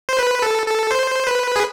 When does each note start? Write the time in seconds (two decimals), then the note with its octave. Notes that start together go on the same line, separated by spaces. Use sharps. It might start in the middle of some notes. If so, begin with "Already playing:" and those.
0.09 C5
0.19 B4
0.42 A4
0.66 A4
0.91 C5
1.27 B4
1.56 G#4